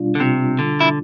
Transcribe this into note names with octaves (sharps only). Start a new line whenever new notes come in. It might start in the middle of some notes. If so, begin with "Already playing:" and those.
Already playing: B2 G3 D4 F4
D3
C3
D3
E4